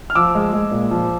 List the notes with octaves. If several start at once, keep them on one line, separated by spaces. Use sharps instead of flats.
F6
F3 D6 E6
G#3
G#3
A#2
F3